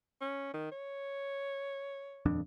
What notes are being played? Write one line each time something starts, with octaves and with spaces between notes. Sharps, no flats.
C#4
D#3
C#5
D#1 F2 D4